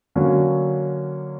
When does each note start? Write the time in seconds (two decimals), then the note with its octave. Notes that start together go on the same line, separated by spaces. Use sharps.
0.15 D3 F#3 A#3 C#4